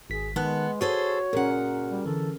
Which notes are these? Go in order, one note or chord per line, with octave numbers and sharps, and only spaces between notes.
G#1 G#4 B6
D#3 G#3 B3 A5 F#6
F#4 G#4 A4 C5 C#5
A#2 C#4 G#4 A#4 F#5
G3
D3 E3 A4